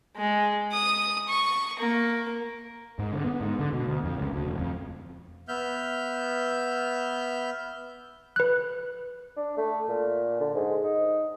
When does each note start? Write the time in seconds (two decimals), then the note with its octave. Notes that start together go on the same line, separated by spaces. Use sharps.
0.17 G#3
0.73 D#6
1.29 C#6
1.80 A#3
2.99 G#2
3.12 D3
3.24 B3
3.41 G#2
3.59 D3
3.73 B2
3.87 D2
4.04 F2
4.17 C#2
4.33 D2
4.47 E1
4.59 F2
5.48 B3 E5 F6 G6
8.36 B4 F#6
9.36 D4
9.58 A3
9.89 A#2
10.40 D3
10.54 G#2
10.83 D#4